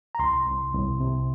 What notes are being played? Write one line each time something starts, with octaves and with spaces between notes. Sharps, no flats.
A#5
C2 C6
C2
C2
C3